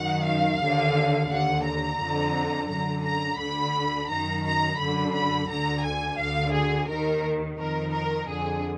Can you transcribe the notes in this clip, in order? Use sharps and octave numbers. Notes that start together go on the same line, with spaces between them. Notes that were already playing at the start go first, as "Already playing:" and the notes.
Already playing: F#2 D#3 F#5
F5
D#2 D3
D#2 D3 F#5
A#5
F2 D3
F#2 D3 A#5
A#5
D2 D3 B5
F#2 D#3 A#5
A#5
F#2 D3 B5
B5
D2 D3 A#5
G#5
D2 D3 F5
G#4
D#2 D#3 A#4
F2 D#3 A#4
A#4
F2 D3 G#4